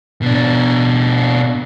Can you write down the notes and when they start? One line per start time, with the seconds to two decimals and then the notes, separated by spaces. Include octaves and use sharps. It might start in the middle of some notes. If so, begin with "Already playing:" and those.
0.22 B2 D4